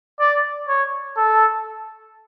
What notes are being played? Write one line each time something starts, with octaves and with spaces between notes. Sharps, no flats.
D5
C#5
A4